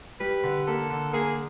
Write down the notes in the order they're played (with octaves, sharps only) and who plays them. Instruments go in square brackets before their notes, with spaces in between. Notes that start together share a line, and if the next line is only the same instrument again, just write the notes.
[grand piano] G3 [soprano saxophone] B4
[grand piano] D3
[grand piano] A#3 [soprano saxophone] A4
[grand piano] D3
[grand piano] A#3 [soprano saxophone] G#4